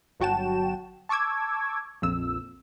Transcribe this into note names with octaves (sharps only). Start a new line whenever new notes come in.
G1 F#3 F#4 G5 A5 E7
A5 C#6 D6 E6 G#6
A#1 F2 E6